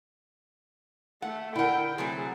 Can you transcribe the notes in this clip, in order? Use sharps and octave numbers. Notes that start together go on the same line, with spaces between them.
A3 F#5
D3 E4 A#4 F#5 G5
C3 F#3 A3 G#4